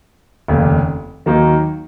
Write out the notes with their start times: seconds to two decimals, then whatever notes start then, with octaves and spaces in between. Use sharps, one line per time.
0.48 F1 D#2 C#3
1.26 D#2 D#3 F#3 A#3 D#4